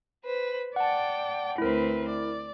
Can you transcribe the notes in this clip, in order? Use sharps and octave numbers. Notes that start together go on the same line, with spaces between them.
B4 C5
D5 F#5 G5 A5
D2 C4 E4 A#4 B4
D5